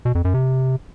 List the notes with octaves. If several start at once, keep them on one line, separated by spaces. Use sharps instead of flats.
B2
F2
F#2
C3